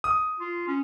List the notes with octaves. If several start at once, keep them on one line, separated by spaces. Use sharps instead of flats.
D#6
F4
C#4